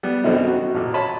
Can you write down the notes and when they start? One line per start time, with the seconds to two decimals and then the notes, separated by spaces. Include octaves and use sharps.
0.03 G3 B3
0.24 F#2 B2 D3 D#3 C4 D#4
0.47 F#4
0.74 A1 A#2
0.94 C#5 D#5 A5 B5 C6